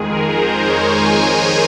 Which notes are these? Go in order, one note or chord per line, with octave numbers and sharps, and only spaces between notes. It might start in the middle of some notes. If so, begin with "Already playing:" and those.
Already playing: F2 D#3 G#3 G#4
A#4
C5
C#5
G#5